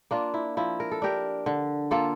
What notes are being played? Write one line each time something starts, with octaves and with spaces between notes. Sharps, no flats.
A#3 D4 F4
E4
F3 E4
A#4
A4
D4 G4 A#4
D3
A#3 F4 A4